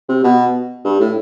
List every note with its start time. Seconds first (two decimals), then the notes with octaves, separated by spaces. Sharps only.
0.09 C3
0.24 B2
0.85 G2
1.00 A2